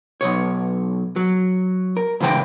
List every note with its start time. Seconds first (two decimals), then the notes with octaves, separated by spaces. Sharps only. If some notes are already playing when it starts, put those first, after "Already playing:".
0.21 B1 G#2 C#5
1.16 F#3
1.97 A#4
2.20 C#2 A2 E3 C5 G5 A#5